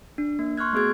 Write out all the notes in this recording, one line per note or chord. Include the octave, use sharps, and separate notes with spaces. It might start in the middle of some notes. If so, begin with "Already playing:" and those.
D4
A#3
C6 C#6 F6 F#6 G#6
A3 B3 F#4 G#4 G#6